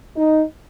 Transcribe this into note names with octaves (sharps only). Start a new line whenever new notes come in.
D#4